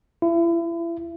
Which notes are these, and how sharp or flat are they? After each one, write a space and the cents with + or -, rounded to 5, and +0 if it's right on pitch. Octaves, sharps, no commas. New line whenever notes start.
E4 +35